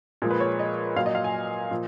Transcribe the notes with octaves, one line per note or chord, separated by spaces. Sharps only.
A#2 F3 G#3
B4
C#5
D#5
A#2 F#3 F5
D#5
F5
G#5
A#2 F3